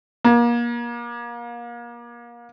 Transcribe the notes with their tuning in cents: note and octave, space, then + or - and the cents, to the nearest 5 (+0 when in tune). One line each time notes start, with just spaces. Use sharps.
A#3 +30